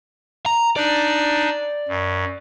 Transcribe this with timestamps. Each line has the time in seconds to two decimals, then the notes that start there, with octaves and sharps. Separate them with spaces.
0.46 A#5
0.76 D4 D#4 D5
1.89 F#2